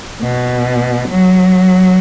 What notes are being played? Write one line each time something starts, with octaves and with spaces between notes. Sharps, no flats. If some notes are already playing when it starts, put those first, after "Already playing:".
B2
F#3